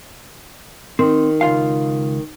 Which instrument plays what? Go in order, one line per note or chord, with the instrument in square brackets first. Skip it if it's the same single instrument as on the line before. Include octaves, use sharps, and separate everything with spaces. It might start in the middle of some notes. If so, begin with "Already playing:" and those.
[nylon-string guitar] D#3 [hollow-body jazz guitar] C4
[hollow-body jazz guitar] C#2 F4 F5